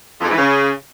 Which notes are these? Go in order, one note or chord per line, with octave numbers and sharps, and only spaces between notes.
F2
G#2
E3
C#3